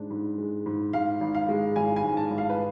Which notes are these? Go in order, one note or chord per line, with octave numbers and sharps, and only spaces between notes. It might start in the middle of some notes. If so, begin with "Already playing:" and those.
Already playing: G#2 G#3 D4
G#2
G#3
G#2
G#2 F5
G#1
F5
G#3
G#1 G#5
G#5
G#2
A5
G#1
F5
B4